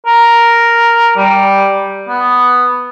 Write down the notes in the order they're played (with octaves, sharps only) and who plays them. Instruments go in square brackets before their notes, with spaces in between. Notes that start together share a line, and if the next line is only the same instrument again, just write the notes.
[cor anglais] A#4
G3
B3